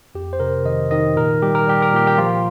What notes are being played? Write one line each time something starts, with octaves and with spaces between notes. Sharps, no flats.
F2 G4
C5
C3 A#4
D#3 D#5
D#3 D#5
A#2 A#4
G3 G4
A#4
G3 G4
A#4
A#2 G4
G4
F3 F4